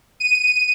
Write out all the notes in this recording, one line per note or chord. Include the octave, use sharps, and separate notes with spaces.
D#7